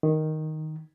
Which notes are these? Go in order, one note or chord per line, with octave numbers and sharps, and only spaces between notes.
D#3